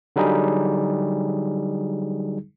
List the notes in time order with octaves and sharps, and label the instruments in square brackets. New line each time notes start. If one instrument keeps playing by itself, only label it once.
[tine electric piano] D3 F#3 G3 D#4 G#4